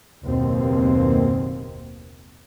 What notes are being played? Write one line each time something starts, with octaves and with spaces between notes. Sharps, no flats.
F#1 D#2 B2 D#3 A#3 C4